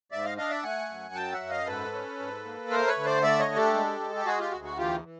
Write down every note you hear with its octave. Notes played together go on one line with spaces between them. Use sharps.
G#2 D5 E5
D#5 F5
D4 D#5 F5
D5 E5
A3 F#5 G#5
F#2
F#3 G5 A5
E5 F#5
F#2
D#5 F5
G#2 A4 B4
C#4
G#2
A#3
A3 A#4 C5
B4 C#5
D3
C5 D5
A3 D5 E5
C#5 D#5
D4
G4 A4
G#3
G#3
G4
G#3 F#4 G#4
F4 G4
D2 F#4
F#4
E2 F4 G4
E3